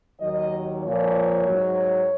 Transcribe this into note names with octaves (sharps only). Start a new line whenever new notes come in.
D#2 D#3 F#3 D#5
A#2 F3 C#5
G#2 F#3